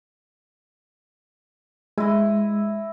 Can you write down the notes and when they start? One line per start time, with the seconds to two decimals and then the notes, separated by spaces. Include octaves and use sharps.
1.98 G#3 E4 D#5